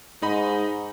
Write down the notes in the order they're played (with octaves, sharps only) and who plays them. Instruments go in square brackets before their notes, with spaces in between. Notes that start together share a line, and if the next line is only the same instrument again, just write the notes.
[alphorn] G#2 [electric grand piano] D#4 D#5 B5